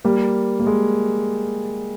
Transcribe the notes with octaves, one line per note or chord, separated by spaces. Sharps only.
G3 A#3
A#3
G#3